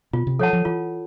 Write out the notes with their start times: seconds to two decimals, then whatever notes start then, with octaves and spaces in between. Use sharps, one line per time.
0.13 B2 F4
0.27 C3
0.39 F3 A4 C#5 F#5 A5
0.53 F3
0.65 E3 F4